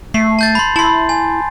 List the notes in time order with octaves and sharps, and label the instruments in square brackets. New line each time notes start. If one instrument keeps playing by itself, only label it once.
[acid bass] A3 [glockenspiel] C7
[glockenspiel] A5 G6 A6
B5 C6
[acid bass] E4 [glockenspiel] A5 C6
[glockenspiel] G#5